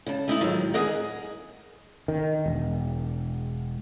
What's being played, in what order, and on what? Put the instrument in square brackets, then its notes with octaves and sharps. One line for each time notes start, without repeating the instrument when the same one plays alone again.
[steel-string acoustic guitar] C#3 A5
A3 D#4 E4
A2 D#3 F3 F#3 G#3
D2 G#4 A#4 D#5 F#5
[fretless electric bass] D#3
E1